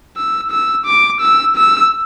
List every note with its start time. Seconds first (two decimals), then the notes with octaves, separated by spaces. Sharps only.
0.17 E6
0.51 E6
0.86 D6
1.21 E6
1.56 E6